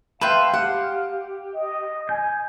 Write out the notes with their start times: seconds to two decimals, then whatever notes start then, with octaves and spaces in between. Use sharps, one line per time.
0.21 B4 E5 F5 G5 A5 C6
0.54 G4 F#5
1.54 D#5
2.09 G#5 G6